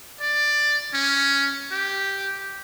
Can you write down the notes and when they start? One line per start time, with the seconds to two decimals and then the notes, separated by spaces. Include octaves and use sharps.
0.20 D5
0.94 C#4
1.71 G4